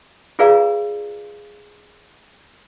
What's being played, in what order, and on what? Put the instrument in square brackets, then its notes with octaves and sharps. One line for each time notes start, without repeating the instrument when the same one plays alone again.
[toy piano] F4 G#4 B4 D5 F5 A#5